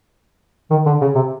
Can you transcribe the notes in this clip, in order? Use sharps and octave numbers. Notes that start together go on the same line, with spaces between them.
D#3
D3
C#3
C3